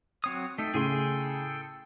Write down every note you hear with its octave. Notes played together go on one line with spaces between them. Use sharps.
F#3 C4 C#5 D#6
A3 D#4 A4 G5
A2 C#3 G#4 G#5 C6